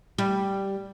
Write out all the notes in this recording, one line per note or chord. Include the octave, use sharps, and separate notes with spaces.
G3